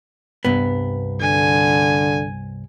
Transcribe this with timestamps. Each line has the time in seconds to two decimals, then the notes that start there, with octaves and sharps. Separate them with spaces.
0.45 C2 G2 B3
1.21 D3 G#5